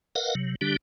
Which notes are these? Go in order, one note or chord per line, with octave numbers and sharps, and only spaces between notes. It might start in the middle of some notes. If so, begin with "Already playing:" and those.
A#4 B4 D#5 F5 F#5
C3 F#3
D3 G3 D4 G4